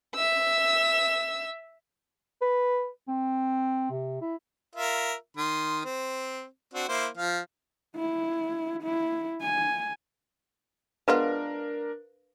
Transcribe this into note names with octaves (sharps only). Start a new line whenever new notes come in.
E5 E6
B4
C4
C3
E4
F4 A#4 E5
D#3 C6
C4
C4 D4 F#4
A#3 E4 C5
F3 F5
E4
E4
G#5
G#3 B3 D4 F4 A#4 B4 F5